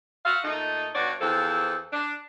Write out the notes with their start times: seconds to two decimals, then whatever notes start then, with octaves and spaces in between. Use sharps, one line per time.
0.25 F#4 E5 F5
0.44 A#2 A3 D#4
0.95 G2 B2 F#4 C#5 D5
1.21 E2 F3 C4 A4
1.93 D4